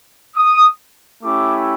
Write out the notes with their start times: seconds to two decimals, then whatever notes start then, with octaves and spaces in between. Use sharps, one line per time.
0.36 D#6
1.23 A3 C#4 E4 G4 D6